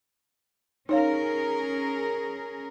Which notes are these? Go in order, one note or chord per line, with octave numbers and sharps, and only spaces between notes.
C#4 D#4 G#4 A#4 C#5 F5